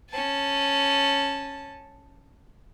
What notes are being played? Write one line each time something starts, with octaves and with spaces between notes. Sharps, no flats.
C#4 A5